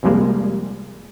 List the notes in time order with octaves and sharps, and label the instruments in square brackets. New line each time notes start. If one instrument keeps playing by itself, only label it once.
[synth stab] C2 F2 F3 G3 G#3 A#3